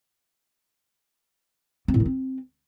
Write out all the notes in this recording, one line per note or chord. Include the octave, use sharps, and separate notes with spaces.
C4
A2
D#3
C4